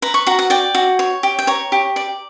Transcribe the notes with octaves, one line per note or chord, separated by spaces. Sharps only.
B4 A#5
C#6
F#4 A#5
F#5
D5 G5
F#4
C#5
G4
G5
C#5 A#5
G4
D5